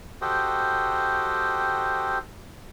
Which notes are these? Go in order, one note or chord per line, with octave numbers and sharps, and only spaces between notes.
F#4 G4 A4 C5 D#5 G5